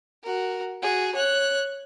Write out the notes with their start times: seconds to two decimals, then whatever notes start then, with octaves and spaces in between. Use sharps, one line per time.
0.23 F#4 A#4
0.82 F#4 G#4
1.15 C#5 F#6